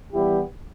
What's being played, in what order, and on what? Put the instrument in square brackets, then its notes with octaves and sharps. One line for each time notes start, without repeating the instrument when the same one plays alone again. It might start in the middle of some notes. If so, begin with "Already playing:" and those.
[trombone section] E3 G3 B3 E4 G4